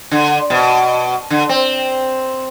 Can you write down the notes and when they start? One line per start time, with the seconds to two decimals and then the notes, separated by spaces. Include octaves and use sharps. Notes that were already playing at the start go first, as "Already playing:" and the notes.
0.11 D3
0.50 B2
1.30 D3
1.49 C4